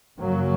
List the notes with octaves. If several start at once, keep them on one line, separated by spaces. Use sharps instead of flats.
F#2 C#3 F#3 A#3